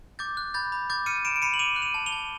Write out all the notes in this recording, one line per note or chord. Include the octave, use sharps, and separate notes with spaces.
D6 G6 A6
F#6
B5 G6 A6
B5
D6 G6 A6
F6 C#7 D#7
B5 D7 E7
D7
B5 C#7 D#7
F#7
D6 D#7 F7
F#6
D#7 F7
A5
F7 G7
A5